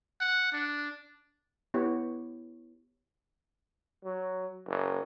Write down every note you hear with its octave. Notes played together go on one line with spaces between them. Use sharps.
F#5
D4
B3 E4 G4 C#5
F#3
F#1